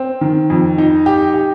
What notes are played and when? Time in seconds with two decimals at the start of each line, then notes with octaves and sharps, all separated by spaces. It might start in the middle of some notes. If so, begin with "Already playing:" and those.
Already playing: C4
0.21 D#3
0.50 F2
0.78 D#4
1.06 G4
1.34 G4